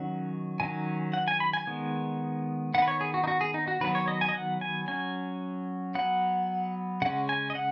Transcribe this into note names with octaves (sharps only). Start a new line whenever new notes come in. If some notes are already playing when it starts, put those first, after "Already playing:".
Already playing: D#3 F#3 C#4 F#5
D#3 F#3 C#4 G#5
F#5
G#5
B5
G#5
D#3 G#3 B3
D#3 B3 F#5
B4
C#5
G#4
F#4
D#4
F#4
G#4
D#4
F#4
D#3 F#3 B3 B4
C#5
D#5
G#5
D#5
F#5
G#5
F#3 C#4 G#5
F#3 B3 F#5
C#3 G#3 C#4 F#5
G#5
D#5
F#5